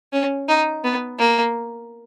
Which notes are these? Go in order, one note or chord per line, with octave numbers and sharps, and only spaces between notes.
C#4
D#4
B3
A#3